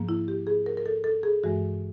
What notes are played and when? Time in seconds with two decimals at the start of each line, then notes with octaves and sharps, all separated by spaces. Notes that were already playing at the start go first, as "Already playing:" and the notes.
Already playing: G#2 F3 A#3
0.09 E4
0.28 G4
0.47 G#4
0.66 A#4
0.77 A#4
0.86 A4
1.04 A4
1.23 G#4
1.44 G2 E3 G#3 F#4